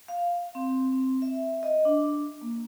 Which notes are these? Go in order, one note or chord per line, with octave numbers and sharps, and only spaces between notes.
F5
C4
C4
E5
D#5
D4
A#3